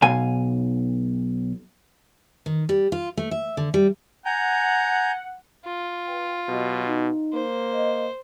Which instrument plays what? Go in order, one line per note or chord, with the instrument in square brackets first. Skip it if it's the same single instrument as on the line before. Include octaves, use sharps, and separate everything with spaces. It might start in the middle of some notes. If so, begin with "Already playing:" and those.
[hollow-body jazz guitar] B1 F5 G#5
[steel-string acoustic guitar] D#3
G3
F4
A3
E5
D3
G3
[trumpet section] F#5 [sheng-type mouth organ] G#5 A#5 G6
[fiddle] F4
[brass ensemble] B4 G5
[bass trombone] B2 [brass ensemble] F#3 G4 D#5
[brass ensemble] D#4
[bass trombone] A#3 [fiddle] C5
[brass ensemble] D#5